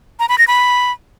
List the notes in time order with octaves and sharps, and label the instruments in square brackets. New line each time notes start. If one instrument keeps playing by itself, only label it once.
[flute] A#5
B5
A#6
B5